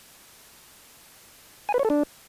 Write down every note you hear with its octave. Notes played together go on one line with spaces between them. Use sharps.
G#5
B4
C#5
A4
D4